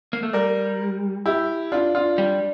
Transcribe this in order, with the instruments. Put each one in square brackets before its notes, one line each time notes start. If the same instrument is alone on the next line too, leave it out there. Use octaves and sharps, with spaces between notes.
[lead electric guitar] A#3
A3
[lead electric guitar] G3 [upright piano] A#4 D5
[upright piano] E4 G4
D4 F4
D4 F4
[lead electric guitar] G3 [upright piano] D4